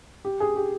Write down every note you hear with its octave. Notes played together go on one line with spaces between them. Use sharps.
G4
G#4
G4